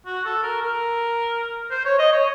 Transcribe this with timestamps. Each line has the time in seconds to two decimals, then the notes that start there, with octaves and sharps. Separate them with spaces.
0.06 F#4
0.25 A4
0.43 A#4
0.62 A#4
1.71 C5
1.85 C#5
1.99 D#5
2.12 C#5